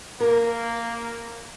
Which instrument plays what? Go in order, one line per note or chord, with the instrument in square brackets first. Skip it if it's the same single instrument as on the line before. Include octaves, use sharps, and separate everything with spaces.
[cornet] A#3 [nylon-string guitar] A#4